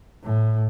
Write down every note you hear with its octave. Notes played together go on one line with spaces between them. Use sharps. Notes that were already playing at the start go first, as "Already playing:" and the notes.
A2